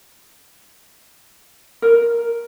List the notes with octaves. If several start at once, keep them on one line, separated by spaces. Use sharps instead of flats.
A#4